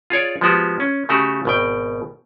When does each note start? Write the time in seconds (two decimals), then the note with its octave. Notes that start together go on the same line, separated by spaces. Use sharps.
0.10 F4 G#4 C#5 D5
0.41 F3 G#3 B3 F#4 G4
0.80 C#4
1.09 C#3 A3 F#4 G4
1.45 G#1 B2 G5